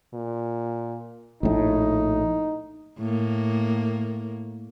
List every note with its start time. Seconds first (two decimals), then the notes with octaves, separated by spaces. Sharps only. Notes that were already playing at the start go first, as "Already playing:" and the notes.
0.13 A#2
1.43 A#1 A2 D#4
2.98 A2 A#3